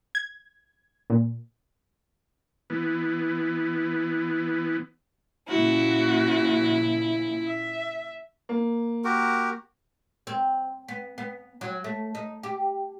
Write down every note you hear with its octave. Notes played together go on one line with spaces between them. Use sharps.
G#6
A#2
E3 B3
A#2 C#3 F3 E4 F#4
E5
A#3
F#4 G4 A#4
C4
B3
B3
F#3
A3
D#4
G4